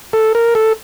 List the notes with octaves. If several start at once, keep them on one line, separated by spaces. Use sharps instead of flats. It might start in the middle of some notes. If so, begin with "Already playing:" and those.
A4
A#4
A4